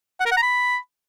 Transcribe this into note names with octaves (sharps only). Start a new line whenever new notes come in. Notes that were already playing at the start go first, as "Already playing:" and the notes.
F#5
A#4
F#5
A#5
B5